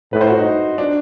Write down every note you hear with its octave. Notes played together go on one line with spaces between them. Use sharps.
A2 B4
C5
F#4
D#4
D4